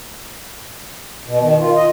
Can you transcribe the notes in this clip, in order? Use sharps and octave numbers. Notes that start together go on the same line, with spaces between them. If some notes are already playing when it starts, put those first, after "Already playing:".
B2
D#3
F4
D#5